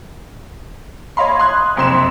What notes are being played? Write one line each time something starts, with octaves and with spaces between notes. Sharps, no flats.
C#5 D#5 F5 B5 C6
C6 D#6 F#6 G#6
F#1 F2 C3 C6 E7